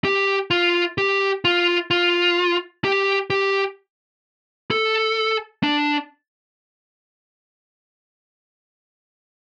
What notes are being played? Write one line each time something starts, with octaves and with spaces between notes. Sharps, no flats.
G4
F4
G4
F4
F4
G4
G4
A4
D4